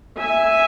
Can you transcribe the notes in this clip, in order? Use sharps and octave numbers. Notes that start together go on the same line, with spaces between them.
E5 G#5